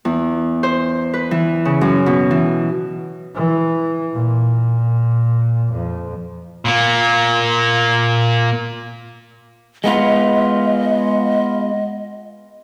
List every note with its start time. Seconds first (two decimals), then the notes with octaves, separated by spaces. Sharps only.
0.05 E2
0.63 C5
1.14 B4
1.31 E3
1.65 C#3
1.81 F#2
2.06 B2
2.31 E3
3.35 E3
4.13 A#2
5.71 F2
6.65 A#2 A#3
9.84 G#3 B3 F4 D#5